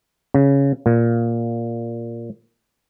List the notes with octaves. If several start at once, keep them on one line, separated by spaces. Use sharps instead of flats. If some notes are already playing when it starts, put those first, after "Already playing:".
C#3
A#2